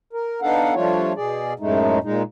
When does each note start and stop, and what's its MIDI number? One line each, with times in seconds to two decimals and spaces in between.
0.13 0.40 70
0.42 0.74 59
0.42 0.74 62
0.42 0.74 63
0.42 0.74 69
0.42 0.74 77
0.42 0.74 78
0.75 1.13 53
0.75 1.13 55
0.75 1.13 57
0.75 1.13 62
0.75 1.13 65
0.75 1.13 73
1.16 1.53 47
1.16 1.53 68
1.16 1.53 74
1.59 1.99 42
1.59 1.99 45
1.59 1.99 56
1.59 1.99 57
1.59 1.99 63
2.04 2.23 46
2.04 2.23 56
2.04 2.23 63